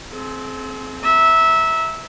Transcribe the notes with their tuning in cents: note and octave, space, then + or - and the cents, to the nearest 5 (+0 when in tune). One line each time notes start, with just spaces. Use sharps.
C4 +0 G#4 +45
E5 -15 A#5 +0